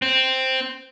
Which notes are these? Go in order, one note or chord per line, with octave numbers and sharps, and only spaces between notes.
C4